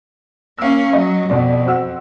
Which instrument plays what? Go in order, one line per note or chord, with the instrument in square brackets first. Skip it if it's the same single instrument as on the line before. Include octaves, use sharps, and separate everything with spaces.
[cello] A#3 C#4 [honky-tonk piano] F5 E6
[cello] F#3 [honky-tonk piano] D#5
[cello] F2 [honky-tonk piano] B2 D5
[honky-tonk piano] C4 F#4 E6